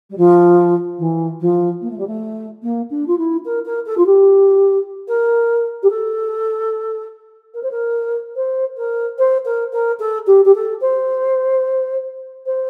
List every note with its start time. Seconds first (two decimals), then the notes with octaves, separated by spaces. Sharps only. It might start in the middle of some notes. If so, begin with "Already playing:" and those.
0.10 G3
0.17 F3
0.99 E3
1.40 F3
1.81 A#3
1.90 A3
1.98 G3
2.07 A3
2.62 A#3
2.90 D4
3.07 F4
3.18 E4
3.45 A#4
3.65 A#4
3.86 A4
3.97 F4
4.06 G4
5.08 A#4
5.83 G4
5.90 A4
7.54 A#4
7.63 C5
7.71 A#4
8.36 C5
8.77 A#4
9.18 C5
9.45 A#4
9.73 A#4
9.99 A4
10.27 G4
10.45 G4
10.55 A4
10.81 C5
12.46 C5